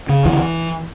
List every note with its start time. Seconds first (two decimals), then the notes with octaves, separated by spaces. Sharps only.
0.09 C#3
0.25 D2 E3